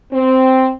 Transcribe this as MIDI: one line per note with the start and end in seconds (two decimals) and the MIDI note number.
0.12 0.71 60